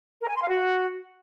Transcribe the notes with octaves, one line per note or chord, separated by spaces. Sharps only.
A#4
G#5
C6
F5
F#4